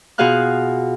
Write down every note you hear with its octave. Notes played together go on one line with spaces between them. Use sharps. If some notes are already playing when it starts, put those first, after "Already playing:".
B2 F4 G#4 F5 F6 F#6